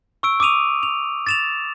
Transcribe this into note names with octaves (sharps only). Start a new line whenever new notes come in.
C#6 E6 D7
D6 D#6 D#7 F7
F7
A6 E7 F7